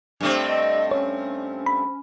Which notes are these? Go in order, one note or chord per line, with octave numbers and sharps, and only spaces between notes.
G2 A3 C4
D#5
C#4 C#5
B5